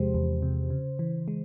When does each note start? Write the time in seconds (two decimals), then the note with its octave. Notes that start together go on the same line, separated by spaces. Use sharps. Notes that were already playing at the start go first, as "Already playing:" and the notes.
Already playing: E2 C3 F3 G#3 G4 C5
0.14 E2
0.42 C3
0.70 C#3
0.99 E3
1.28 G#3